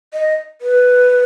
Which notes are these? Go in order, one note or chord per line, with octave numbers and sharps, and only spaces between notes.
D#5
B4